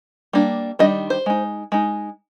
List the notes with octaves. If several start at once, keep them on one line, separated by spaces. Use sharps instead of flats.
G3 A#3 D4
D#3 G3 D4 D#5
C5
G#3 D#4
G#3 D#4